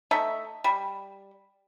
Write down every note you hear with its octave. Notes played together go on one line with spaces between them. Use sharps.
A3 D#4 E5
G3